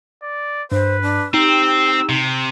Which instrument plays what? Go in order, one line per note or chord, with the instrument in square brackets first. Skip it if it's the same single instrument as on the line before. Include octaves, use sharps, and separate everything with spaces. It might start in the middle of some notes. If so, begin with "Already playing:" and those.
[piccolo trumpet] D5
[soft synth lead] G2 [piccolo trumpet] B4 [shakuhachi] C5
[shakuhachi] D4
[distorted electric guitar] C4 [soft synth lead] D#4 [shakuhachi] G4 [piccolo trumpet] E6
[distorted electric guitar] C3